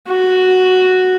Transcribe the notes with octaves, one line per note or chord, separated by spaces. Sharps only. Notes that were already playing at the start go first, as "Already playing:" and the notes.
F#4